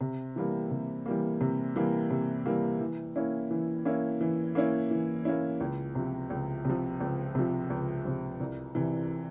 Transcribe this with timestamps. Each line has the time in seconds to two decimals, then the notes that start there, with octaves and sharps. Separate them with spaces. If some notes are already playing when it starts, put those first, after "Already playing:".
0.01 C3
0.36 E3 G3 A#3
0.71 C3
1.06 E3 G3 A#3
1.41 C3
1.76 E3 G3 A#3
2.11 C3
2.46 E3 G3 A#3
2.81 E3
3.16 A#3 C#4 E4
3.51 E3
3.85 A#3 C#4 E4
4.21 E3
4.55 A#3 C#4 E4
4.91 E3
5.25 A#3 C#4 E4
5.60 C#2
5.95 C3 F3
6.30 C#2
6.65 C3 F3
7.00 C#2
7.35 C3 F3
7.70 C#2
8.05 C3 F3
8.40 C2
8.75 C3 E3